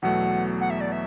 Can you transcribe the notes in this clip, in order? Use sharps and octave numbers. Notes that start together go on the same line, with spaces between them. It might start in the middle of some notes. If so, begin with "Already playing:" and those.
E2 B2 F#3 A3 F#5
F#5
E5
D5
E5